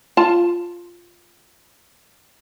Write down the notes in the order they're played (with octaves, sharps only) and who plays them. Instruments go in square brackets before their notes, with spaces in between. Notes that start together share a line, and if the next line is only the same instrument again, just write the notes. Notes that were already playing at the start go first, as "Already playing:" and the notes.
[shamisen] F4 A5